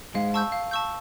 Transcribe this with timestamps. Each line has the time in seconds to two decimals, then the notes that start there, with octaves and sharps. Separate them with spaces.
0.14 G#2 G#3 F5
0.34 A5 C#6 E6 G6
0.52 F5
0.71 A5 C#6 E6 G6